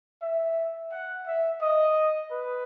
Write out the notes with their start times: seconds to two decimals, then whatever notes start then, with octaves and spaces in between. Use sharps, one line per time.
0.22 E5
0.91 F#5
1.26 E5
1.61 D#5
2.31 B4